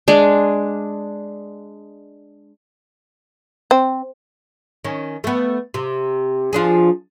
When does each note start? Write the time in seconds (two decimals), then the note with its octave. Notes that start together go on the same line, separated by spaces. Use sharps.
0.08 G#3 D4
3.71 C4
4.85 D#3 C#4
5.24 A3 B3
5.74 C3
6.53 F3 D4 G#4